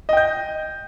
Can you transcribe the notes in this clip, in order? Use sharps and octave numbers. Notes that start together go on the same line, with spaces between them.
D#5 G5 G6